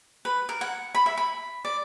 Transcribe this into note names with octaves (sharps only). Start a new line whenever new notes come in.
B4
A#4
F#5
B5
E5
B5
D5